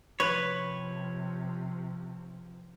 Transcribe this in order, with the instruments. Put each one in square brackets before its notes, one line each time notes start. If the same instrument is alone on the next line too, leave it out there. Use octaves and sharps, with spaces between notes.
[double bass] C3 F3 [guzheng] B4 [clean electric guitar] C#5